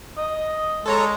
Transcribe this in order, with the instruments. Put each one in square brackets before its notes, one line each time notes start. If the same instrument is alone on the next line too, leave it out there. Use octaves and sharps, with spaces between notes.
[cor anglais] D#5
[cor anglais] G#3 [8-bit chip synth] A4 C#5 A#5